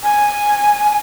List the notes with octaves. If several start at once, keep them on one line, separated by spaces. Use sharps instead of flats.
G#5